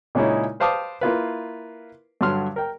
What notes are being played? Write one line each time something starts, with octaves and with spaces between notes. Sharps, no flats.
A#2 C#3 G#3 C#4 D#4 E4
B4 C5 F5 A5 D6 D#6
A#3 E4 F4 B4
G2 D3 F#3 C6 F6
A#4 G5